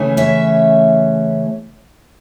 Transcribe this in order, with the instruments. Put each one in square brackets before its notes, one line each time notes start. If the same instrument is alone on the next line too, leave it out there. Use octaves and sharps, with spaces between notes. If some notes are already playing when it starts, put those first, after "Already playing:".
Already playing: [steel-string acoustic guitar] C#3 E3 A3 C#4
C#5 E5